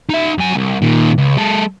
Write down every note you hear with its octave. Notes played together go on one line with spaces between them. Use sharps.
D#4 E5
F#2 G#5
C2
A#2 D#3
C#2
G#3 A4